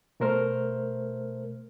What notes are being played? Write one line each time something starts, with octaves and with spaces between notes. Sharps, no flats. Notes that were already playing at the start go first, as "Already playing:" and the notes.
B2 A3 A#4 C5 F6